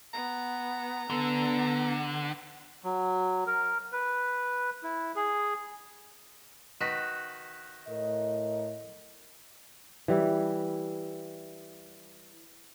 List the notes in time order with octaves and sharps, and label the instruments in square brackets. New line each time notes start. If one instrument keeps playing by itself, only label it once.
[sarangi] B3 [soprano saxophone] A#5
[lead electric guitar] D3 [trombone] B3 [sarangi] A4
[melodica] F#3
A#4
B4
E4
G#4
[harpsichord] D#3 F#4 B4
[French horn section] A2 A#4 D#5
[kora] E3 G3 E4